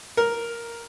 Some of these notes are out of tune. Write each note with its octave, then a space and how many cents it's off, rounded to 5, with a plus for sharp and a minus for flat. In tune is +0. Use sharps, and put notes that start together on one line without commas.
A#4 +0